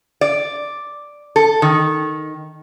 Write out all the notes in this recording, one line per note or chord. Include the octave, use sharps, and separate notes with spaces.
D5
A4
D#3